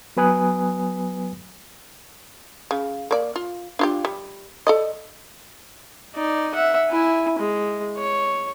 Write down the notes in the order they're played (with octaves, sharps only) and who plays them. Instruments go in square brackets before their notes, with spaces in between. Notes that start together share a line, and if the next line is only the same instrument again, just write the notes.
[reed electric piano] F#3 B3 B4 G#5 D#6 F#6
[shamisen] C#3
A#3 D5
F4
D4 F4 G4
G3
A4 D5 D#5
[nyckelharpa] D#4 D5
E5 F#5
E4 G#5
G#3
C#5